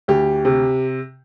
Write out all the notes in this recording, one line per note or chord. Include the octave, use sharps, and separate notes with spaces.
D2 G4
C3